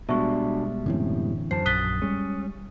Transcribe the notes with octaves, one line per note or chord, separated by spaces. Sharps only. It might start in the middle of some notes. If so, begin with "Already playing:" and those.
B2 G3 G#3 B3 D4 F#4 E5 C#6
F#2 A2 D3 E3 C4
F#2 C5 A5 C7
A#1 D#6 F#6 A6 B6 G7
G3 G#3 C#4